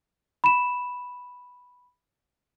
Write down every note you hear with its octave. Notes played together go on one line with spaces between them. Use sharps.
B5 E7